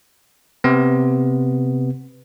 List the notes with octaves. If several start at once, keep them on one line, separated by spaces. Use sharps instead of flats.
C3 B3